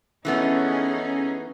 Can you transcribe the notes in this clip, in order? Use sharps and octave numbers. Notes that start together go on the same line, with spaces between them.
E3 A3 B3 C#4 D#4 G#4